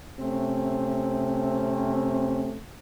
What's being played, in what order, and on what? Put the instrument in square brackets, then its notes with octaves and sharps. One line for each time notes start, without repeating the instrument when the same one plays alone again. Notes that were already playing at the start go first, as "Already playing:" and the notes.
[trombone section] C3 A3 C4 C#4